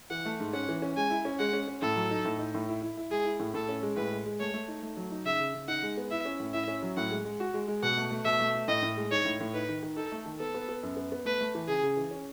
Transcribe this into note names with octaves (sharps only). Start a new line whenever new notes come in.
E3 F#5
A3
G#2
C#4 F#5
E3
C#4
G#3 G#5
E4
C#4
G#3 F#5
C#4
C#4
A2 A4
F#3
D#4
A2
D#4
A2
E4
E4
E4
G#3 G#4
E4
A2
A2 A4
C#4
G#3
A2 B4
G#3
G#3
A3 C#5
A3
D#4
A3
F#3
D#4
C#3 E5
C#3
C#3
D#4 F#5
G#3
B3
E4 E5
C#4
A2
E4 E5
C#4
F#3
A2 F#5
G#3
G#3
F#4
G#3
G#3
B2 F#5
A3
A3
B2 E5
A3
A3
A2 D#5
A2
G#3
D#4 C#5
A2
A2
D#4 B4
D#3
D#3
D#4 A4
A3
D#3
B3 A4
B3
B3
F#2
B3
B3
A3 B4
A3
E3
C#3 G#4
C#3
E3
C#4